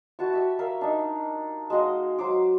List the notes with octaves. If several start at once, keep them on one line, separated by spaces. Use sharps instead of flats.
E4 F#4 A5 C#6
G4 E5
A#4 E5 F5
D4 D#4
G#3 F#4 D#5 F5
F#3 C5 D6